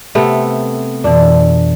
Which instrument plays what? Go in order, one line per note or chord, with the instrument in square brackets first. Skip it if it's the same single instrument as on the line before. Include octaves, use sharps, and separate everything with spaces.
[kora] C3 A3 B3
[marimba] F2 B2 E3 [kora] D4